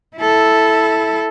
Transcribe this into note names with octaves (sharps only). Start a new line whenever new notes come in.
E4 A4